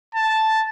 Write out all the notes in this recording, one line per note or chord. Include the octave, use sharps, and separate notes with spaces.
A5